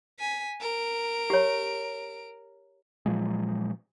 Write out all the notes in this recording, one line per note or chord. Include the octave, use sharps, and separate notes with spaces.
G#5 B6
A#4 D7
G4 C#5
A#2 F3 F#3 G#3